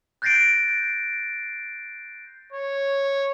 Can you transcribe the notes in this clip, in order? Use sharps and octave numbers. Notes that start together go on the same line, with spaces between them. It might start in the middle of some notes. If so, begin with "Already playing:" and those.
F#6 G6 A6 A#6 C7 D7
C#5